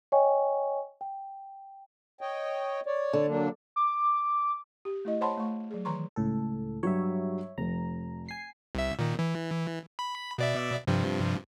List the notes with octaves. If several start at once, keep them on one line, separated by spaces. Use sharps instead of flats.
C#5 D#5 G5 G#5 C#6
G5
C#5 D#5 G5
C#5 D5
D3
F#3 A#3 D4
D6
G4
A3 E4 D#5
C5 C#5 F#5 A5 B5 C6
A3 C#6
F#3 G#4
D#3 E3 A#5 C6 C#6
C#2 A2 A4
G2 F#3 G3 C#5 E5
F1 A#5
G#5 C7
C2 E5
A#2 D#3
E3
B5
B2 D5 E5
G2 C3 F3